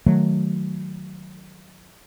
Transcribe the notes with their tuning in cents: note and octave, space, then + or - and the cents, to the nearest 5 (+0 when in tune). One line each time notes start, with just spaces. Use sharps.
D#3 +0 F#3 +0 A3 -10